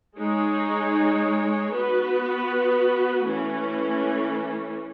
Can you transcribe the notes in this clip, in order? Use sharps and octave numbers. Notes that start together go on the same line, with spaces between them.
G#3 D#4 G#4 C#5
B3 F#4 B4
E3 A3 C#4